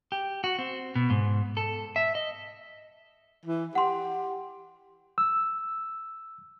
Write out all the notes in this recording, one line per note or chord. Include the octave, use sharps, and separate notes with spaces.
G4
F#4
C4
B2
G#2
A4
E5
D#5
E3
G4 F#5 C6
E6